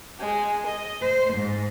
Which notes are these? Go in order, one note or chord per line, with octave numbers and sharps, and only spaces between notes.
G#3
D#5
C5
G#2